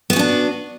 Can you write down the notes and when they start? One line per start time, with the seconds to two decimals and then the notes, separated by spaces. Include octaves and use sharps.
0.10 B3
0.13 F#4
0.16 C#4
0.19 D4